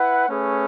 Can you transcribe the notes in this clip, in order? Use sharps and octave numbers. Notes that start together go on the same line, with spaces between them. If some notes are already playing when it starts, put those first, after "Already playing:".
Already playing: E4 B4 F#5
A3 C#4 G#4 B4